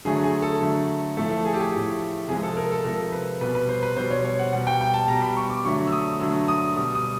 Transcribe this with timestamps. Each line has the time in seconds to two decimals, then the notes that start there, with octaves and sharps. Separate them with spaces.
0.05 D3 F#3 A3 G#4
0.24 G#4
0.42 A4
0.61 D3 F#3 A3
1.17 A2 F3 A3 A4
1.31 A4
1.45 G#4
1.54 G4
1.59 G#4
1.72 A2 F3 A3
2.28 C3 F3 G#3 G#4
2.43 A4
2.57 A#4
2.71 A4
2.84 C3 F3 G#3 A#4
3.12 B4
3.41 B2 G3 B4
3.55 B4
3.69 C5
3.83 B4
3.97 B2 G3 C5
4.10 C#5
4.19 C5
4.25 C#5
4.39 F#5
4.53 B2 G3 F#5
4.67 G5
4.81 G5
4.94 A5
5.08 B2 G3 A#5
5.22 B5
5.37 C#6
5.50 D6
5.65 D3 F#3 A3 C#6
5.87 E6
5.92 D#6
6.20 D3 F#3 A3 E6
6.48 D#6
6.76 B2 G3 D#6
6.95 D#6